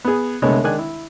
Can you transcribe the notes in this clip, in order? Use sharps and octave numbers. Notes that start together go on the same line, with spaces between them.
B3 G#4
C2 D3 G#3 A3 B3 C#5
D#3 G#3 D4 G#5 F#6
E4